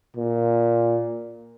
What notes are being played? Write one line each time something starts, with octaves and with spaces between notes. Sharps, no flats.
A#2